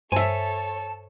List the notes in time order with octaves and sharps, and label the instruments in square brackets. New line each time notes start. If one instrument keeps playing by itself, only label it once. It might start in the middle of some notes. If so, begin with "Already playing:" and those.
[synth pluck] G2 C5 [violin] A4 C#5 [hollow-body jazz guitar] E5 G#5 [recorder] A5